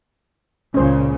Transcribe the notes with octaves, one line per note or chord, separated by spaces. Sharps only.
C#2 A#2 C#3 C#4 C5